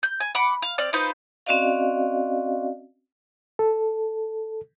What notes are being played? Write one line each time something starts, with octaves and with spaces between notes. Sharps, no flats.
G6
G#5
F#5 B5 D6
F5
C4 D5 F6
D#4 F4 B4 C5
C4 C#4 F#4 D5 D#5 F5
A4